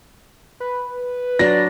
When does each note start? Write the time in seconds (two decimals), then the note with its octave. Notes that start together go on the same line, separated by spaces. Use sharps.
0.60 B4
1.39 F#3 D4 D5 A#6